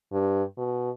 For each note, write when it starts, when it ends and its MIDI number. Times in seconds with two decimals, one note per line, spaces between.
0.12 0.43 43
0.57 0.90 47